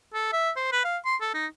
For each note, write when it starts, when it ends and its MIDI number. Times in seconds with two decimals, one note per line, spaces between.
0.14 0.29 69
0.32 0.50 76
0.56 0.67 72
0.72 0.81 71
0.84 0.97 77
1.05 1.16 84
1.21 1.29 69
1.34 1.46 63